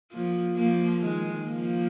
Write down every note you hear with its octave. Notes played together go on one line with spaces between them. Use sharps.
F3 A#3
F3 A#3
D#3 G#3
F3 A#3